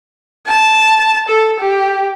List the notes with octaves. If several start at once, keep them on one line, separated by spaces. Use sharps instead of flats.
A5
A4
G4